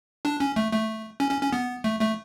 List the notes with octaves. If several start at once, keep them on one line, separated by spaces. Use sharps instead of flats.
D4
C#4
A3
A3
C#4
C#4
C#4
B3
A3
A3